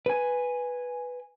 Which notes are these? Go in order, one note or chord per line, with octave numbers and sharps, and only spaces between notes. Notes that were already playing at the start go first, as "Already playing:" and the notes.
B4 G#5